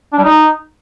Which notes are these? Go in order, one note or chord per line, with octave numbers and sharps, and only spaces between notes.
D4
G3
D#4